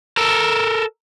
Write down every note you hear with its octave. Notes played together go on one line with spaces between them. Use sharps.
A4 A#4